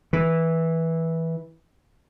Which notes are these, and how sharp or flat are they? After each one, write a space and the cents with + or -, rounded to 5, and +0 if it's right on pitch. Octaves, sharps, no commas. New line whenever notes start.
E3 -10